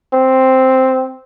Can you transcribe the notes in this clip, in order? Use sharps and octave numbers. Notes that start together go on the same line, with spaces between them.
C4